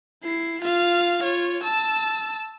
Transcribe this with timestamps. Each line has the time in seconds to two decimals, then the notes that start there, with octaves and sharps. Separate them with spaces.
0.23 E4 C7
0.62 F4 F5
1.22 F4 C#5
1.64 A5 E6